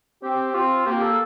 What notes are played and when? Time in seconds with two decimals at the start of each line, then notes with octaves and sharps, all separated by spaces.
0.22 C4 G4
0.54 C4 F4
0.86 A#3 G4
1.02 A4